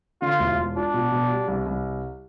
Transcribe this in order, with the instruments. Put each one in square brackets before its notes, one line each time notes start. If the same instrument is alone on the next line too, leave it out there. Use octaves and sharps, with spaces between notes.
[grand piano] D3 [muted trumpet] F4
[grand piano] E1
E1
[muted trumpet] D4 [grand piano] F4
[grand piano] B2
B2
G3
C2
C2